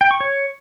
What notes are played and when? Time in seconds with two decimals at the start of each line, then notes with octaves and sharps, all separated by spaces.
0.01 G5
0.11 C#6
0.21 C#5